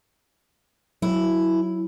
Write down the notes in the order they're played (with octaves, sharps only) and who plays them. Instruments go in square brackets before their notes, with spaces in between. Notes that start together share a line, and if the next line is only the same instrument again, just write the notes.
[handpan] F#3 [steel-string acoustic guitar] E4